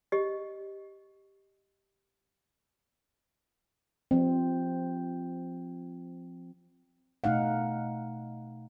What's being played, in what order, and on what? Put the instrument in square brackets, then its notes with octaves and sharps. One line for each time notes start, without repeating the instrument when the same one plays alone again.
[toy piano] G4 D#5
[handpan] F3 C4
B2 A3 D#4 F5 F#5